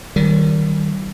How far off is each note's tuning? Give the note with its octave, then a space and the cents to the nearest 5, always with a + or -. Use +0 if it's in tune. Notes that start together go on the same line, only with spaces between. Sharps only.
D#3 +0 G3 -35